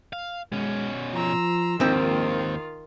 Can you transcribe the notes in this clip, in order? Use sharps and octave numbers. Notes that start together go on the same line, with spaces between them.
F5
B2 G#3 C#4
F3 A#5 C6 E6
A#1 D#2 G#2 D#3 C4 F4